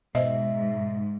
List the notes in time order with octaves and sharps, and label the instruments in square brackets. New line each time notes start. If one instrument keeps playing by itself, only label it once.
[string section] G#2 [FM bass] B2 [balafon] C5 D#5 [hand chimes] E5